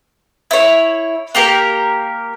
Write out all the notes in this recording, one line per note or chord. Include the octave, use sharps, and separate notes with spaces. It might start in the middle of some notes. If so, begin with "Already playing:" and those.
E4 C#5
A#3 G4 A#4